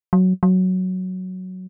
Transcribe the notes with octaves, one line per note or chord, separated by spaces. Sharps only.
F#3
F#3